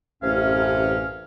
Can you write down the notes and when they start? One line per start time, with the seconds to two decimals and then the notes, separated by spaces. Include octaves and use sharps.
0.23 A1 F#2 C3 C#4 F5